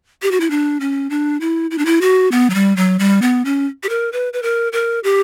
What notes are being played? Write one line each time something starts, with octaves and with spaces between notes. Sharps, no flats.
G4
F#4
E4
D4
C#4
D4
E4
E4
D4
E4
F#4
B3
F#3
G3
F#3
G3
B3
C#4
G4
A#4
B4
B4
A#4
A#4
G4